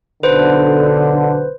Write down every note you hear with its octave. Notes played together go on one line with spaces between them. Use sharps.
B1 D3 B4 C5